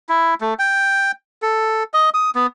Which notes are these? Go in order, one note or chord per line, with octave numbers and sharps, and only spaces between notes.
E4
A3
G5
A4
D#5
D#6
B3